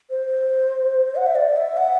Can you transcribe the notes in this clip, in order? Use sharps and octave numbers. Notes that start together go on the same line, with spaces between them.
C5
F#5
E5
D5
E5
F#5